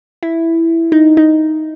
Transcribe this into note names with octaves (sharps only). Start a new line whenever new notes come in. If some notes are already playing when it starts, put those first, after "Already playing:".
E4
D#4
D#4